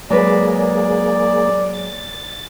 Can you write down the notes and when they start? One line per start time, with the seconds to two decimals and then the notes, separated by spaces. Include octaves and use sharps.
0.10 F#3 G#3 A#3 G#4 B4 D5
0.59 D5
1.74 A6